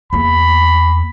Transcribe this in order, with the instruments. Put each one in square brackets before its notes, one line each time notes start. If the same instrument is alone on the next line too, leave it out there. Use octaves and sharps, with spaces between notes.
[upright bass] E2 A#3 [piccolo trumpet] B5